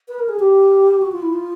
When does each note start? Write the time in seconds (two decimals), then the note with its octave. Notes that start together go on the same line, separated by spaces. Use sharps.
0.08 B4
0.19 A#4
0.29 G#4
0.39 G4
1.02 F#4
1.12 F4
1.22 E4
1.33 F4